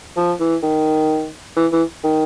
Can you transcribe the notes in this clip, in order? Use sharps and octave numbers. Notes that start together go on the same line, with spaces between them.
F3
E3
D#3
E3
E3
D#3